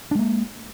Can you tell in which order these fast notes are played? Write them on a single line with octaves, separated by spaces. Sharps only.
D4 G#3 A#3